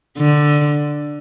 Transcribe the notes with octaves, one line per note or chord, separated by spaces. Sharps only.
D3